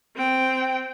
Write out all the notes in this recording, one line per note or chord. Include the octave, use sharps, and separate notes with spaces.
C4 G5